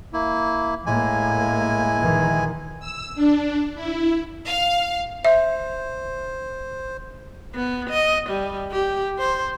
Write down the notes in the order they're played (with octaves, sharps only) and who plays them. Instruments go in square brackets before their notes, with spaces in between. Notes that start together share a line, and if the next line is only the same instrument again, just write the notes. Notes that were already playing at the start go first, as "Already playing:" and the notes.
[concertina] A#3 E4
[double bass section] A2 A#3 [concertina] G#3 E4 G#5
[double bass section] A#1 D#3 E3
[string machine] E6
D4
E4
[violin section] F5
[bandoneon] C5 [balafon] E5
[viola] B3
D#5
G3
G4
C5